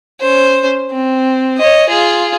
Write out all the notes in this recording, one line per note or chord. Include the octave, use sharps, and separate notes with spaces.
C#4 C5
C4
C#5 D#5
F4 G#4